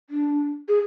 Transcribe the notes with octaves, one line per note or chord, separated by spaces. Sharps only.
D4
G#4